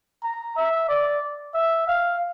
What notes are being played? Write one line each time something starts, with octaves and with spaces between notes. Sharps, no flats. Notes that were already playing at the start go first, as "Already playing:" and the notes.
A#5
E5
D5
E5
F5